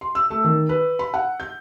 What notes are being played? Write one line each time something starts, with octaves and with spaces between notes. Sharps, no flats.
C6
E6
A3
D#3
B4
B5
F#5
G6